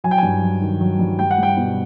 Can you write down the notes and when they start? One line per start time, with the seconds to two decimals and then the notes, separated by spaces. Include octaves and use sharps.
0.04 F#3 G#5
0.11 G5
0.18 G2 G#5
0.42 F#3
0.61 D#3
0.81 F#3
0.99 G2
1.19 G3 G5
1.31 F#5
1.38 G3
1.43 G5
1.57 B2